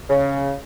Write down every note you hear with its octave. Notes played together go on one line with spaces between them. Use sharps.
C#3